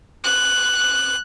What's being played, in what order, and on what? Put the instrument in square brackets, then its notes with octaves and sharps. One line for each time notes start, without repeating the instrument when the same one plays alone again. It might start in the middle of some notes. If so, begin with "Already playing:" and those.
[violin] F#6